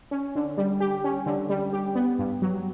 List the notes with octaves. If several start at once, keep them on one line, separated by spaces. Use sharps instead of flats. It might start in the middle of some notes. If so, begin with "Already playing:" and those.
C#4
D3
G3
G4
C#4
D3
G3
G4
B3
G2
F#3